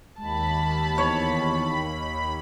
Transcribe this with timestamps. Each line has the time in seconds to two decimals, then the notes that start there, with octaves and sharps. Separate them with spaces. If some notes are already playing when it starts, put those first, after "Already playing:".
0.19 D#2 G#3 A5 B5
0.98 E2 C#5